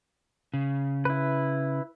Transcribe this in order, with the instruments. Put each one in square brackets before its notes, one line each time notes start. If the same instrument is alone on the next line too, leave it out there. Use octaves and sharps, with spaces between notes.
[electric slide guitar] C#3
[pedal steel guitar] E4 B4